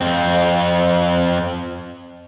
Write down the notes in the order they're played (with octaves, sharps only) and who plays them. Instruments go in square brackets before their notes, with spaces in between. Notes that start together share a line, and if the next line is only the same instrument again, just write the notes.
[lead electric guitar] F2 C4